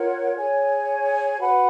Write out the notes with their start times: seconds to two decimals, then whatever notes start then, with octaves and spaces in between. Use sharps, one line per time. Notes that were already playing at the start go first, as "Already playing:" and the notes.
Already playing: F4 A#4 C#5 F#5
0.36 G#4 C#5 G#5
1.40 F#4 B4 F#5 B5